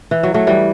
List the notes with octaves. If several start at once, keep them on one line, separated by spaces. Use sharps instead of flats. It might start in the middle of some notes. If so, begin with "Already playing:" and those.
E3
F#3
F#3 A3
E3 G3